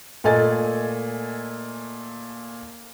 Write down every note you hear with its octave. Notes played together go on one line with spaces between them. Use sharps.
A#2 A3 A4 D#5 G#5 A6